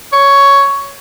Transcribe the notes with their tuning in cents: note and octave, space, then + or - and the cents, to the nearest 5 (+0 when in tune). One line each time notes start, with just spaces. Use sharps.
C#5 +10